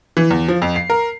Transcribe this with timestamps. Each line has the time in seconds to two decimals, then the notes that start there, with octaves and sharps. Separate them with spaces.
0.17 E3
0.31 E2
0.48 F3
0.62 F2
0.76 C7
0.90 A#4